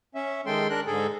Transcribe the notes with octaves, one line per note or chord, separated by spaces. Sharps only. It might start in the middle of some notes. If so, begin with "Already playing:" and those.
C#4 E5
D#3 G#3 A4 G5 C6
D4 A#4 F#6
G#2 D3 G#4 A4